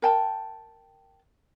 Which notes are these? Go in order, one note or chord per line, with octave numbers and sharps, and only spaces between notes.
A#4 G5 A5